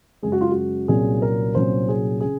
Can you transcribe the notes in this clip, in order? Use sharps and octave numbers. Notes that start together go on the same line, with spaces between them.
F#2 C#3 G#3 G#4
F#4
F4
F#4
C2 A#2 F#3 C#4 G#4
A#4
C2 A#2 F#3 C#4 C5
G#4
C#3 G#4